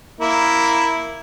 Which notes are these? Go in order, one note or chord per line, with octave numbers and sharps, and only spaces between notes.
A#3 E4